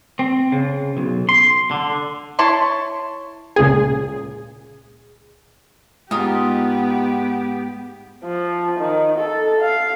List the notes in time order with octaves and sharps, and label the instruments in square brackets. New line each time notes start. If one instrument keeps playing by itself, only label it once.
[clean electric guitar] C4
C#3
B1
C6
D3
[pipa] E4 C#5 A5 C6
[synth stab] C#2 A#2 G#4
[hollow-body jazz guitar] G#2 [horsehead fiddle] B3 G4 [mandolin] D#4 F4
[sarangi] F3
D#3
A4
F5